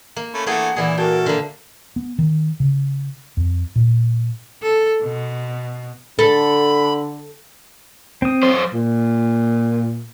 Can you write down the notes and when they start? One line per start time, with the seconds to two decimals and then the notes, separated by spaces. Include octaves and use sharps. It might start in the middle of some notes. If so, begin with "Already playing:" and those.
0.16 A#3
0.34 A3 C#4 B5
0.46 E3 A3 A#3 G#4 F#5 G5
0.76 A#2 E3 E4 G#4 D5
0.97 F#4 A4 A#4 G5
1.26 D3 A#3
1.96 B3
2.19 D#3
2.60 C#3
3.37 F2
3.76 A#2
4.62 A4
5.02 B2
6.19 D3 A4 B5
8.22 C4 D#6
8.43 F#2 C5
8.73 A#2